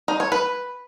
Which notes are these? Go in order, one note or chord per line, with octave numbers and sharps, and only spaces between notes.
D#4
C#5
B4